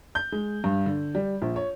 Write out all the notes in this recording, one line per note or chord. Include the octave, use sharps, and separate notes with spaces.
G6
G#3
G2
D3
G3
A#1
C#5